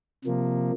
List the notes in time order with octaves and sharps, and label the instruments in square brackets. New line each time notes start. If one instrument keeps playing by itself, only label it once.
[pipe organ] C3 F3 A#3